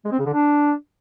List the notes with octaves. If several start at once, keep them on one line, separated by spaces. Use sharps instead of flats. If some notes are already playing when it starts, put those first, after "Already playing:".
G#3
C4
C#3
D3
D4